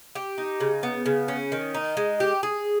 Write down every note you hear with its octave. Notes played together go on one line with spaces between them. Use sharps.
G4
D#4
C#3
B3
C#3
C#4
D#3
D#4
G#3
G4
G#4